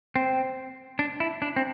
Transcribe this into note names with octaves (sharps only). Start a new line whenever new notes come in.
C4
D4
E4
D4
C4